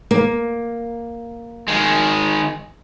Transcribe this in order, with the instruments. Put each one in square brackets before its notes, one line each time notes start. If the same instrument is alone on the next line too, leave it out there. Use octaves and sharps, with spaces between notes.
[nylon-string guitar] A#3
[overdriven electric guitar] D#3 G#3